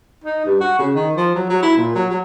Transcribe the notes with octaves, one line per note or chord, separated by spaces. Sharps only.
D#4
G2
F#4
C#3
D#3
F3
F#3
F#3
E4
A#2
F#3
F#3